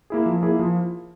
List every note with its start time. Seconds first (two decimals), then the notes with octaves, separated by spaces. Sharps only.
0.10 A#3 E4 G#4
0.26 F3
0.43 A#3 E4 G#4
0.59 F3